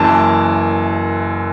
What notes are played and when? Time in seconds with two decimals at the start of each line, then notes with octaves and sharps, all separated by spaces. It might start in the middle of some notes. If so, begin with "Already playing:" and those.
Already playing: F#1 F#2 E3 A5